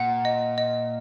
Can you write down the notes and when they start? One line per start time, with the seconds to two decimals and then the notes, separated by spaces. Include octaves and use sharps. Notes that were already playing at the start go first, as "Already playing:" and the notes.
Already playing: A#2 F#5
0.25 D#5
0.58 D#5